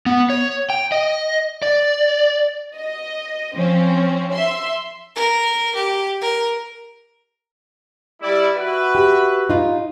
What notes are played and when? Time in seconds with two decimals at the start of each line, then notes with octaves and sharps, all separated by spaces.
0.06 B3
0.30 C#5
0.70 G5
0.92 D#5
1.62 D5
2.76 D#5
3.54 F3 C4 C#4
4.33 E5 C6
5.16 A#4
5.75 G4
6.21 A#4
8.22 G3 E4 D5
8.55 F#4 B4 E5
8.95 G4
9.49 D#4 F4